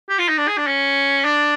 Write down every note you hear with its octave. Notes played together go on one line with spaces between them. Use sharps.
G4
F4
D#4
D4
G#4
D4
C#4
D4